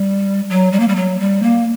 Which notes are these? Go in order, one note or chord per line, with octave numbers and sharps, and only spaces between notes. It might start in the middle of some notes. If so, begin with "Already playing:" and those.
Already playing: G3
F#3
G3
A#3
G3
F#3
G3
A#3